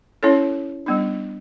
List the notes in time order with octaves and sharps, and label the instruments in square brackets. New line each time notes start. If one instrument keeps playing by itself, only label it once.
[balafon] C#4 E4 A4 C#5
G3 B3 D4